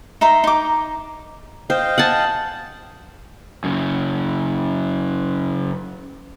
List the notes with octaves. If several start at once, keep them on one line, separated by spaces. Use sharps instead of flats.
D#4 E5 A#5 C6
D#4 D6
C5 D#5 F5 G5
F#5 G#5 A5
F#2 C#3